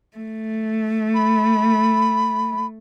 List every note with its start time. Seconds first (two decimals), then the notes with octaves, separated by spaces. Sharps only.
0.17 A3
1.15 B5